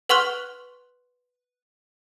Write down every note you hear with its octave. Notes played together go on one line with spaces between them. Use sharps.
B4 F#5 C6 C#6 F6 F#6